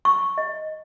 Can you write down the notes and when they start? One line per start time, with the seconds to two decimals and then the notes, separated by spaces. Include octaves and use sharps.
0.05 C#6
0.38 D#5